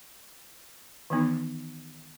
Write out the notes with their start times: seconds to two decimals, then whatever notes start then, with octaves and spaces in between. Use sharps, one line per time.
1.10 D#3 E3 B3 D#4